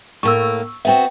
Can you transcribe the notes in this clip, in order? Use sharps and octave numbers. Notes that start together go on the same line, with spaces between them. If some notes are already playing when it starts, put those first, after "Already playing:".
A2 A#3 C#6 E6
B3 C4 F#4 E5 G5